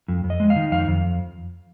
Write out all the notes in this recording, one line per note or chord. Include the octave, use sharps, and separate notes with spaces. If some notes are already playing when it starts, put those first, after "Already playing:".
F2
F2
D#5
G#3
F5
D#3
F2 F5
F2